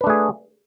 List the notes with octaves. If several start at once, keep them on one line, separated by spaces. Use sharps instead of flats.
A3 D4 G#4 B4